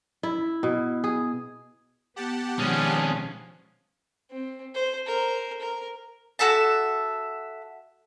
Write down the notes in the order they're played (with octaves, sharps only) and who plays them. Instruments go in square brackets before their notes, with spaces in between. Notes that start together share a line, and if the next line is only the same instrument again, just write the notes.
[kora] E4
B2
G#4
[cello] B3 [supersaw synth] G4 F#5 A5
[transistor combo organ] B2 D#3 G#3 [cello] F3 [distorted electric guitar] C#4 D4
[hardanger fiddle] C4
C5
A#4 C5
A#4
[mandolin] F#4 A4 E5 A5